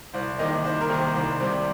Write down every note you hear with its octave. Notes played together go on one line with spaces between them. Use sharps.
C2 C5
C3 D#3 A#3 D#5
C2 C5
A#4
C3 D#3 A#3
C5
C2 C5
C3 G3 C4